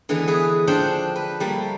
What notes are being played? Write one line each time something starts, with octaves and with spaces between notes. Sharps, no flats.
D3 E3 G#3 B3
B3 G#4 B4
F3 D4 C5 F#5 G5 C6
B4
G3 A3 A#3